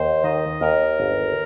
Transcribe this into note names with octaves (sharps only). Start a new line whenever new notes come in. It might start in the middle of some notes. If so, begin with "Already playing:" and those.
Already playing: D#2 C5
D#3 D#5
D#2 A#4
G1